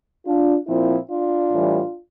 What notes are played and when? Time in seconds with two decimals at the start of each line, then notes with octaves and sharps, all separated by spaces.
0.26 D4 F4
0.67 A#2 F3 C4 E4
1.09 D4 F4
1.51 A2 E3 G3